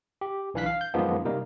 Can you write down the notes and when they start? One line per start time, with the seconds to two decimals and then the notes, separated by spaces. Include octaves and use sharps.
0.21 G4
0.54 B1 E3 D4 F5 F#6 B6
0.66 F5
0.81 G6
0.94 F#2 D#3 F3 G#3 A#3 B3
1.25 C3 G3 A#3 D#4 A#4